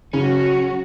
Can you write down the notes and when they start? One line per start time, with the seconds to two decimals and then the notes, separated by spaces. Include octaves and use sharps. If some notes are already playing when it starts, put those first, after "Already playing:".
0.13 C#3 F#3 C#4 F#4